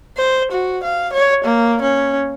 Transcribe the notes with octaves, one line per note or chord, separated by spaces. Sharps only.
C5
F#4
F5
C#5
A#3
C#4